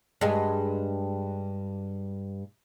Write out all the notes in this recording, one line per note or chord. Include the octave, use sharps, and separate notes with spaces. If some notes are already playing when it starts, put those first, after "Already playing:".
G2 G#3